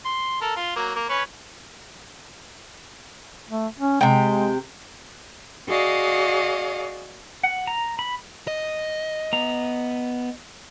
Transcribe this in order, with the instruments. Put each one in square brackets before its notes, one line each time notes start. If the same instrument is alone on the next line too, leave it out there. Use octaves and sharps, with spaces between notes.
[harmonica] C6
A4 A#4
F4
F#3 A#3
A#3
C#4 B4 C#5
[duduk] A3
C#4
[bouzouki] C3 G5 [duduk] G#3
[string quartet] F#4 G#4 D5 D#5 F5
[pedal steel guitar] F#5
A#5
B5
[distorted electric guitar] D#5
[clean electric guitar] B3 A#5